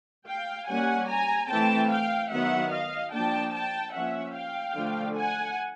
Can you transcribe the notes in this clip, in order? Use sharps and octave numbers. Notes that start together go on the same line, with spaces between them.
F5 G5
G3 A#3 C#4 F#5 G#5
G#5 A#5
E3 A3 C4 G5 A5
F5 G5
D#3 F#3 B3 E5 F#5
D#5 F5
F3 A#3 D4 G5 A5
G5 A5
F3 A#3 C#4 E5 F#5
F5 G5
D3 F3 A3 D4
F#5 G#5